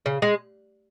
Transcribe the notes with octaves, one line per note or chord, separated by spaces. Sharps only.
C#3
G#3